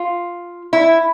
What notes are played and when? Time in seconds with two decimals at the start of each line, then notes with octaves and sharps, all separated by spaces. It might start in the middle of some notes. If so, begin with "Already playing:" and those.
Already playing: F4
0.73 E4